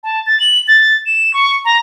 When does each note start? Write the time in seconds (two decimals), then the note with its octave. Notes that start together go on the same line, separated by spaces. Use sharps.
0.04 A5
0.26 A6
0.40 F#7
0.68 A6
1.06 E7
1.34 C#6
1.65 A#5